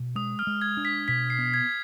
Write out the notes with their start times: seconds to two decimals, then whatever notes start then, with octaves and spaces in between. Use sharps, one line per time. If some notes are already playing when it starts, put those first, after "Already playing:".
Already playing: B2
0.16 G#3 D#6
0.39 F6
0.47 G#3
0.62 G#6
0.77 D4
0.85 B6
1.08 B2 B6
1.30 C7
1.39 B3
1.54 G#6